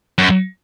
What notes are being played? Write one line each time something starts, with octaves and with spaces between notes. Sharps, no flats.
F#2